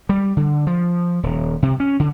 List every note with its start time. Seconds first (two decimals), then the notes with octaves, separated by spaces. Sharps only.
0.09 G3
0.37 D3
0.67 F3
1.23 D#1
1.63 C3
1.80 C#4
2.00 D3